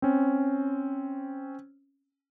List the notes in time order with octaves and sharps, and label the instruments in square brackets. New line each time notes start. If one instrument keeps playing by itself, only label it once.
[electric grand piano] C4 C#4